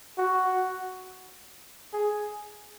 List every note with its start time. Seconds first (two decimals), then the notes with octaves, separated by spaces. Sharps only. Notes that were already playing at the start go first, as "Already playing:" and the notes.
0.18 F#4
1.93 G#4